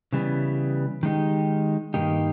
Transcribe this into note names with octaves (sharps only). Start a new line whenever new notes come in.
C#3 E3 G3 B3
D#3 G#3 D#4 G4
G2 D#3 A#3 D#4 G4